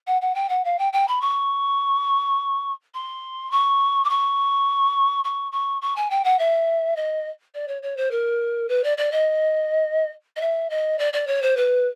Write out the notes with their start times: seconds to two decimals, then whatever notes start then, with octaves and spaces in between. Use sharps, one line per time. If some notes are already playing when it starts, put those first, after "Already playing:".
0.07 F#5
0.21 F#5
0.34 G5
0.49 F#5
0.64 F5
0.78 G5
0.93 G5
1.07 B5
1.21 C#6
2.94 C6
3.51 C#6
4.04 D6
4.09 C#6
5.24 C#6
5.52 C#6
5.81 C#6
5.96 G#5
6.10 G5
6.24 F#5
6.39 E5
6.96 D#5
7.54 D5
7.68 C#5
7.82 C#5
7.97 C5
8.11 A#4
8.68 B4
8.83 D5
8.97 D5
9.12 D#5
10.36 D#5
10.41 E5
10.70 D#5
10.98 D5
11.13 D5
11.27 C#5
11.42 C5
11.57 B4